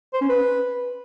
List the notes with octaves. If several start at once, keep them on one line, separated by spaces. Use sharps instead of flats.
C5
C#4
B4